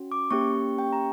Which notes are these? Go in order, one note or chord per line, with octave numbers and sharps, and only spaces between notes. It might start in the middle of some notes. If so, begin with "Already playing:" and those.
Already playing: C#4 F#4
D6
A#3 C#4 G4 C#6
G5
A#5